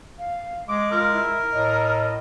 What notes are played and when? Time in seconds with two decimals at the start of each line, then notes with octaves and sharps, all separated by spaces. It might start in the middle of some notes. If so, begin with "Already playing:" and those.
0.18 F5
0.68 G#3 D6
0.91 F4 A#4
1.13 E4
1.52 A2 D#5